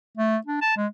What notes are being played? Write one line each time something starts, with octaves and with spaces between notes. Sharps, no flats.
A3
D4
A5
G#3